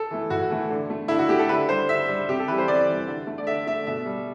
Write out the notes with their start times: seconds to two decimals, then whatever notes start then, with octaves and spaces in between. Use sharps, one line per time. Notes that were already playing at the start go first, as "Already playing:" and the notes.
Already playing: A4
0.11 E3 A3
0.30 A2 F#4
0.51 E3 A3
0.70 D3
0.90 A3
1.08 D3 E4
1.19 F#4
1.29 A3 G4
1.39 A4
1.49 D3 B4
1.69 G3 C5
1.89 D3 E5
2.08 G3
2.29 C3 G4
2.39 A4
2.48 E3 G3 B4
2.58 C5
2.68 C3 D5
2.88 E3 G3
3.07 D3
3.27 A3
3.38 D5
3.47 D3 E5
3.67 A3 E5
3.87 B2 E5
4.06 G3